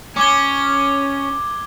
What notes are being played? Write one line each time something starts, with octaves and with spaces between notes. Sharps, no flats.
C#4 D6 G#6 G7